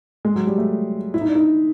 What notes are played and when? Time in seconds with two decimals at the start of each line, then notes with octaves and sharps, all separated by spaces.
0.25 G#3
0.36 F#3
0.47 G3
0.58 A3
1.14 E4
1.21 D#4
1.28 D4
1.35 D#4